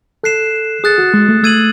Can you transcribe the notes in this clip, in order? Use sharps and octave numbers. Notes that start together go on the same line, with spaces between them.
A4 F#6 C7 E7
G#4 D#6 F#6 A6 C#7
F#4
G#3
A3
A3 E6 G#6 D#7 F#7